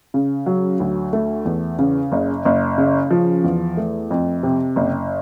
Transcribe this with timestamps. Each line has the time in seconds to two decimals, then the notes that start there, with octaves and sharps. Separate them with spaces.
0.14 C#3
0.46 F#3
0.80 D2
1.13 A3
1.45 E2
1.79 C#3
2.12 F#1
2.45 F#1
2.78 C#3
3.11 F3
3.44 E2
3.77 A3
4.11 F2
4.43 C3
4.76 F#1